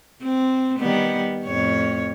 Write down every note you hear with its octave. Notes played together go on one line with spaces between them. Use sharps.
C4
D#3 G3 B3
F2 A2 C#5